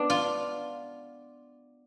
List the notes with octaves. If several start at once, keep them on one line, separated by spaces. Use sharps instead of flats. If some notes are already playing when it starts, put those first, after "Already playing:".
Already playing: B3 D4
F4